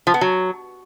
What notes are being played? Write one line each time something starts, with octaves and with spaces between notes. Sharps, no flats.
F3
B3
F#3